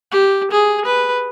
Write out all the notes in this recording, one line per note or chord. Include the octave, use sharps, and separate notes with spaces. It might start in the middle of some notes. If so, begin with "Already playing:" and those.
G4
G#4
B4